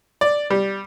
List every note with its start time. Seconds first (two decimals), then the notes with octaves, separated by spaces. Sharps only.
0.21 D5
0.50 G3